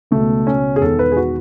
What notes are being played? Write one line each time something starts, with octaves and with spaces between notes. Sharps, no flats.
C#2 B2 A3
C#4
G#4
E1 E2 D#3 A4
B4
G#4
F#4